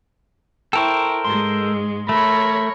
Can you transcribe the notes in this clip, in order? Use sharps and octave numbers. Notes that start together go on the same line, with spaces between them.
E4 A4 A#4 C5 G5 C#6
G#2 G#3 C6
A3 A#4 C#5 B5